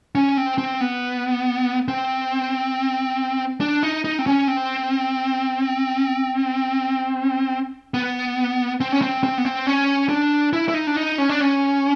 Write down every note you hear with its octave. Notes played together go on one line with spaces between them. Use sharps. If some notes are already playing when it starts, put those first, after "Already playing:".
C#4
C4
C4
B3
C4
D4
D#4
D#4
C4
C#4
C4
B3
C4
C#4
C4
C4
B3
C4
C#4
D4
E4
E4
D#4
D4
D#4
C#4
D4
C#4